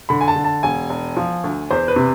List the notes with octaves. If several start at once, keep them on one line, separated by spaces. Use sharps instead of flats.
D3 B5
G#5
A5
D3
A5
E1 G#5
E1
F3
D2
E2 C5
B4
C3